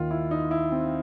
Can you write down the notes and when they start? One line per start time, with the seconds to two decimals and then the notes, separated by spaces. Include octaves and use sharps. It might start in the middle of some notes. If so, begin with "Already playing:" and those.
Already playing: D#2 D#3 F4
0.11 E4
0.31 D#4
0.51 E4
0.72 C4